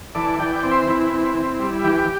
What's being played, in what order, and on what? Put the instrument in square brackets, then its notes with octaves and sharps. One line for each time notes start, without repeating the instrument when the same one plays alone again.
[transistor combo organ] E3 A4 D5
E3 D5 G5
D5 G5
C4
C5 E5
E3 E4
C4
C4
G3
E3 G4